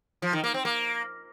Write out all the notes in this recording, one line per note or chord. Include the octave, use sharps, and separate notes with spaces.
F3
D#3
A#3
C4
A#3